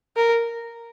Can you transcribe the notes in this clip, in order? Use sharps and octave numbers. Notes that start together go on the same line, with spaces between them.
A#4